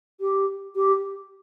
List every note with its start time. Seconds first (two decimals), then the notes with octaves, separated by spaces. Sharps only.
0.20 G4
0.75 G4